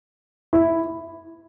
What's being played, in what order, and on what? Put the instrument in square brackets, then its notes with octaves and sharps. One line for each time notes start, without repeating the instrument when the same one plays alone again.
[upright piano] E4